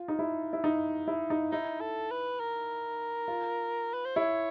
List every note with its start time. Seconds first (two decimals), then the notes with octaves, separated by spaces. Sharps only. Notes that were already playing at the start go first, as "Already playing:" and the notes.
Already playing: F4
0.08 D#4
0.19 E4
0.53 E4
0.64 D#4
1.08 E4
1.30 D#4
1.52 D#4 E4
1.81 A4
2.11 B4
2.40 A#4
3.28 F4
3.94 B4
4.05 C5
4.16 E4 C#5